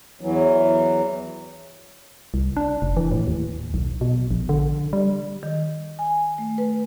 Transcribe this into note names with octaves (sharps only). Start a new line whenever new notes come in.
E2 E3 F#3
C2
D4
F1
E3
A2
D#2
B1
B2
A#1
D3
G3
D#3
G#5
A3
B4